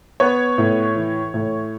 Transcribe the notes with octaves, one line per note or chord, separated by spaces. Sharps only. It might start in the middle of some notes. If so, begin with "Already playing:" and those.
B3 C#5
A2
E3
A2